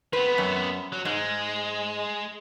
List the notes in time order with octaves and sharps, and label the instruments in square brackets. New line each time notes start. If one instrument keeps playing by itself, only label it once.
[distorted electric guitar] B3 C4 [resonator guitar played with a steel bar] B4
[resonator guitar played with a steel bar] F#2
[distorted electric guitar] F#3
[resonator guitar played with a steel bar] G#2 [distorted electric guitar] G#3